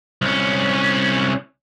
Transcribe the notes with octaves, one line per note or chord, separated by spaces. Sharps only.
C2 C#4